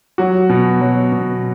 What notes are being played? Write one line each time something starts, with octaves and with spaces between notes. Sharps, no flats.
F#3 F#4
B2
F#3
B2